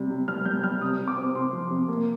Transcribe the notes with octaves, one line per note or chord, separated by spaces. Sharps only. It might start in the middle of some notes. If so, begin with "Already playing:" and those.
Already playing: C3 G3
C3
G3 F6
G3 G6
G3 F6
C3 D#6
C3
D6
C4
C3 C6
F3
C3
A#3